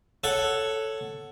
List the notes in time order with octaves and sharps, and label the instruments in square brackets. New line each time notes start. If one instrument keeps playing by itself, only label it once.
[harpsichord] A4 C#5 F#5